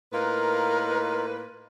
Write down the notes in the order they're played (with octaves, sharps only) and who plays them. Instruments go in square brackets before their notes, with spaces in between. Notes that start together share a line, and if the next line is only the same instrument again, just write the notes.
[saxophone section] A2 A#3 B4 [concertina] D#4 F4 [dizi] A#4